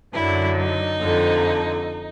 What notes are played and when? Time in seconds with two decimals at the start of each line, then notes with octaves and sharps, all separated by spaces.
0.12 F#2 D3 F#3 E4
0.56 D#4
0.99 F2 D3 F3